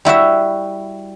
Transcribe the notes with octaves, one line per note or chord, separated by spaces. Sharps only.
G3 E4 F#4 E5